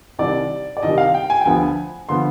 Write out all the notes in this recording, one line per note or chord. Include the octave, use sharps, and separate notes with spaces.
C2 C3 D#3 G3 D5
D5
C2 C3 D#3 G3 D#5
F5
G5
G#5
G5
D2 D3 F3 B3 G#5
D3 F3 B3 C6